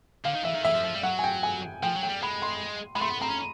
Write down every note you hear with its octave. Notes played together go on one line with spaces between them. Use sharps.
D3 F5
D#3
E3 E5
D#3
E3 E5
F3
F3
G3
F#3 F#5
G#5
G5
G#5
F3 G5
F#3
G5
G3
G#3 B5
C6
G#3 B5
A3 C6
B3
C4 A#5
C#4